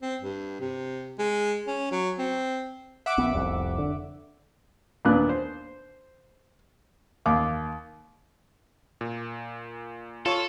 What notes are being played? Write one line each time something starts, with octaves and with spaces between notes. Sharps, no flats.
C4
G2
C3
G#3
C#4
F#3
C4
E5 F#5 D6
A#1 B3
F1 C2 F2
D3
D#2 A#2 B3 D4 F#6
C5
D#2 F5 D6
A#2
F4 A4 C#5 C#6